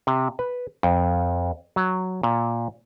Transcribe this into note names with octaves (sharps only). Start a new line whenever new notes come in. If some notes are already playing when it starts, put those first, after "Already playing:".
C3
B4
F2
F#3
A#2